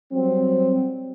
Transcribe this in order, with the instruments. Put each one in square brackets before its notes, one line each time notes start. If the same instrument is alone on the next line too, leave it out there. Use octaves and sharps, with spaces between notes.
[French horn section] F#3 G3 C4